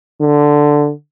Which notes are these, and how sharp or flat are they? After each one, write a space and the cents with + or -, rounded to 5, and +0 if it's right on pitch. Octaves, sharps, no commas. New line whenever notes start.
D3 +0